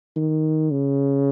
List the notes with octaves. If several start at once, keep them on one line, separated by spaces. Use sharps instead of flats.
D#3
C#3